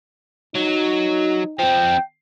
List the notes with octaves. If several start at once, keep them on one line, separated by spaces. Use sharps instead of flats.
F#3 D#4
F3 C4 G5